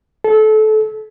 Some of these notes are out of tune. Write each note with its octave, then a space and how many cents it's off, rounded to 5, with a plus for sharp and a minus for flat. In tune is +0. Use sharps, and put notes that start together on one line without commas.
A4 -25